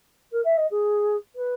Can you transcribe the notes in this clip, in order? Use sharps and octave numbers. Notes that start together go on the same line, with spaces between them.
A#4
E5
D#5
G#4
B4